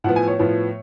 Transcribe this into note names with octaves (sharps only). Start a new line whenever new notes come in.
A2 F3 B3 F#5
G#5
C#5
A2 F3 B3